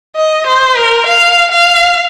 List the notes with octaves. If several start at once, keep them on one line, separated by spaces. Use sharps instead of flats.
D#5
C5
A#4
F5
F5